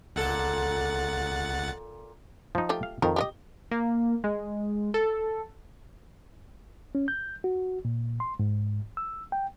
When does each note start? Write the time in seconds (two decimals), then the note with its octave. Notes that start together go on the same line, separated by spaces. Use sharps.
0.16 C#2 A#2 A4 F#5 A6
2.55 F3 D#4
2.69 A3 F4 G4
2.83 F5
3.02 F2 D#3 A#4
3.16 G4 A#4 D#5
3.71 A#3
4.24 G#3
4.94 A4
6.95 C#4
7.08 G6
7.44 F#4
7.85 A#2
8.20 C6
8.39 G#2
8.97 E6
9.32 G5